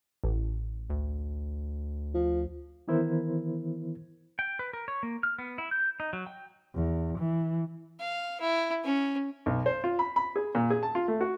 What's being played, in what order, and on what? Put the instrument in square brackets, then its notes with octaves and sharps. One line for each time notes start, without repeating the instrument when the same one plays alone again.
[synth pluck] A1
[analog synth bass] D2
[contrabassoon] F3
[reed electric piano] D#3 E3 B3 E4 A#4 C5
[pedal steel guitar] G5
B4
A#4
C#5
A#3
F6
B3
E4
G6
D#4
F#3
G5
[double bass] E2
E3
[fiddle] F5
E4
C#4
[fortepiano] B1
C5
F4
B5
B5
G#4
A#2
G#4
A5
F4
A3
F#4